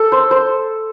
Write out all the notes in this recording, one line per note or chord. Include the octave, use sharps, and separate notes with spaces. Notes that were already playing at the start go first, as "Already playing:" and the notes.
Already playing: A4
C5
C5